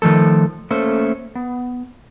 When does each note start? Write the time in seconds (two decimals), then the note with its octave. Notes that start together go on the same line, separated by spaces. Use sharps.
0.02 D#3 F3 A3 A4
0.71 A3 A#3 C#4 A4 C5
1.35 B3